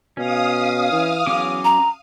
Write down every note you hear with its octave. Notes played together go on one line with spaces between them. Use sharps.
B2 C#4 F5 D#6
E3
E2 F#3 C#4 D6
A#5